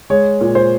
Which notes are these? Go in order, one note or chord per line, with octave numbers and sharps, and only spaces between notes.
G#3 C#5
A#2
C5